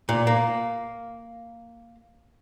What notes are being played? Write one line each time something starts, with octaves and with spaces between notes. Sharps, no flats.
A#2
A#3